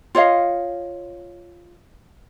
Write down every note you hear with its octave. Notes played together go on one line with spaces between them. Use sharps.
F4 C#5 D#5 F5